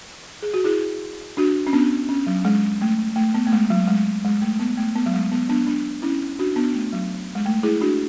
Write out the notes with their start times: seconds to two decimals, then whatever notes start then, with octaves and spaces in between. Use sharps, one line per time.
0.42 G#4
0.54 F#4
0.64 E4 G#4
1.37 D4 F#4
1.67 C#4
1.73 B3 D4
2.09 C#4
2.27 F#3
2.45 G#3
2.81 A3
3.16 A3
3.34 B3
3.47 A3
3.52 G#3
3.70 F#3
3.88 G#3
4.25 G#3
4.41 A3
4.59 B3
4.77 A3
4.96 B3
5.06 F#3
5.14 G#3
5.32 B3
5.49 B3 D4
5.67 B3 D4
6.02 C#4 E4
6.39 D4 F#4
6.56 B3 D4
6.74 A3
6.93 F#3
7.35 G#3
7.45 A3
7.63 E4 G#4
7.81 D4 F#4